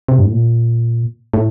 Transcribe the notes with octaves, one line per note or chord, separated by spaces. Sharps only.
C3
G2
A2
A#2
A2